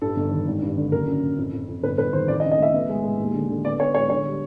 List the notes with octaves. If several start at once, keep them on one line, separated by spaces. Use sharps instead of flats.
G2 A4
G1
D#3
G#1
G2
D3
F#1 A#4
F#2
F#1
F2
F2
F2
G1 B4
G1 B4
D#3 C5
F2 D5
D#5
C#3
D#5
A3 E5
B3
G#3
G#3
D#2
D3
D3
B3 D5
B3 C#5
G#3 C#5
D3 C#5
G3